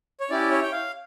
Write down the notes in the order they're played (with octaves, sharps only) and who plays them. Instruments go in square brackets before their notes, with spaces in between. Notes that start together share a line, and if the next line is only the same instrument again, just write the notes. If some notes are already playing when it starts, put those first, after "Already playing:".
[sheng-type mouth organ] C#5
C#4 E4 G4 D5
C#5
G5
F5